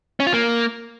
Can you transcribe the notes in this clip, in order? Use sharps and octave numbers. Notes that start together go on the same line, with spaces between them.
C#4
F4
A#3